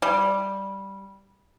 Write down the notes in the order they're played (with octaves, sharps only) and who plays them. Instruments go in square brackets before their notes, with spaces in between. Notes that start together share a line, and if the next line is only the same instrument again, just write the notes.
[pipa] G3